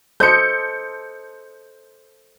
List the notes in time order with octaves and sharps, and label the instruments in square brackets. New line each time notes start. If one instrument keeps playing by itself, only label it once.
[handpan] A4 C5 D#5 [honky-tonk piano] G6 C#7